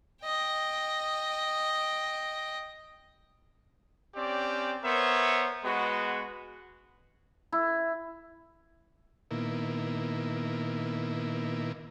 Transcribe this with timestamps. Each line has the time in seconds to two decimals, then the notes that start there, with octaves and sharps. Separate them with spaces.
0.23 D#5 G5
4.15 C4 C#4 G4 D5
4.83 B3 A#4 C5 C#5 E5
5.64 G#3 B3 F#4
7.52 E4
9.31 A#2 D#3 A#3 B3 E4